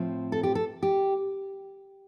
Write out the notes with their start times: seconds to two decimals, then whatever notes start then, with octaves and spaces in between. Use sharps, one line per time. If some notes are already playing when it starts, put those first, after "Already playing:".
Already playing: A2 F3 C4
0.32 A4
0.43 G4
0.55 A4
0.83 G4